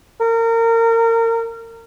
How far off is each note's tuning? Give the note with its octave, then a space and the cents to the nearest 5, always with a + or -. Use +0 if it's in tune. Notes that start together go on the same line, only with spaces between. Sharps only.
A#4 -30